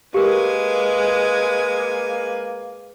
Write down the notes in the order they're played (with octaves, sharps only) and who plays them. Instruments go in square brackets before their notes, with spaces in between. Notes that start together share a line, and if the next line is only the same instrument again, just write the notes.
[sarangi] G#3 [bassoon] A#3 [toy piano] G4 A#4 [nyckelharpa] B4 G#5